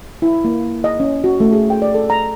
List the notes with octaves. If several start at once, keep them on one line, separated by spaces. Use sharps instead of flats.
E4
A#3
D#5
C#4
F#4
A3
G#4
G5
D5
A4
A#5